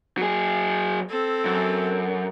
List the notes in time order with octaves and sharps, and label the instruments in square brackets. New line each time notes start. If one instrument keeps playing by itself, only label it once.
[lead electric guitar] F#3 G#4
[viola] C4 A4
[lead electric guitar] F#2